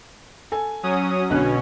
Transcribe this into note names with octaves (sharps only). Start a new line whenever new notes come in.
A4 G#5
F#3 C#4 D#6
B1 B2 D3 C#4 F#6